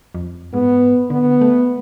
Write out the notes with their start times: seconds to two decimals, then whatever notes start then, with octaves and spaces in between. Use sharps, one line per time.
0.15 F2
0.54 G#2 B3
1.10 D3 B3
1.41 A3